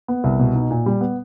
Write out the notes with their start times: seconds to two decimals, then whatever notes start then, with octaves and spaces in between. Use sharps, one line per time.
0.08 B3
0.24 C2
0.39 B2
0.55 D#4
0.71 A#2
0.86 G3
1.01 B3